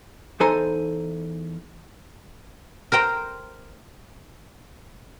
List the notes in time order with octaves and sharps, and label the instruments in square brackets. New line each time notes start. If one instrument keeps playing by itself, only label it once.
[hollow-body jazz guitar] E2 D#4 A4 C5 G#5 A#5
[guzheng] A#4 C5 G5 A#5